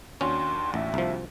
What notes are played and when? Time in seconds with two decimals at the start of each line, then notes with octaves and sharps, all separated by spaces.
0.21 D#2 C#4 D4 F#4 C6
0.74 A1 E5
0.94 C2 F3